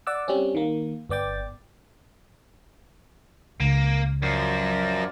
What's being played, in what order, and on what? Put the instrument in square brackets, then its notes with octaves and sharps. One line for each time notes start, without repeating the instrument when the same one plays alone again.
[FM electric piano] D5 F#5 D6 E6
G3 C4 C#4
D#3 A#3
G1 B3 D5 G5 A6
[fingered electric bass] C#2 [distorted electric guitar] A#3
[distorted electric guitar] F#2 [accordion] F3 A#4 D5